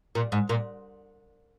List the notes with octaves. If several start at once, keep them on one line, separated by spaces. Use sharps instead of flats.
A#2
G#2
A#2